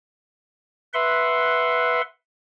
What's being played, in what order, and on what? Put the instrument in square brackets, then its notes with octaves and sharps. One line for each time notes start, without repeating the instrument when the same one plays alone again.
[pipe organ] B4 E5 F#5 C6